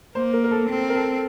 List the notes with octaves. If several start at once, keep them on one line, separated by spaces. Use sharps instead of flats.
A#3 C5
A#4
A#4
A4
C4
A#4
A4